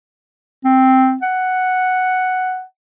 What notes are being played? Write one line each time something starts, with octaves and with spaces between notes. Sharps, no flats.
C4
F#5